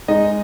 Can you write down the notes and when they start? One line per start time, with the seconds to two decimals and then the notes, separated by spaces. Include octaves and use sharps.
0.08 G#3 D#4 D#5